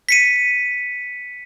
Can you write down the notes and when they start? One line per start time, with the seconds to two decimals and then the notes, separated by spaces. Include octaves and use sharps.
0.09 B6 C#7 D#7